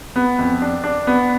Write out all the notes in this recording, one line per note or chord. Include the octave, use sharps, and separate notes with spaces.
B3
F2
D4
D4
B3